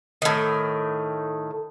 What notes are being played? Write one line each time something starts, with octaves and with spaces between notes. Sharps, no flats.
A2 D#3